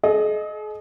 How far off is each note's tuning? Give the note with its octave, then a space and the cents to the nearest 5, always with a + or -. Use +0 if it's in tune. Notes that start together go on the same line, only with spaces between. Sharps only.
G#4 +45 D#5 -10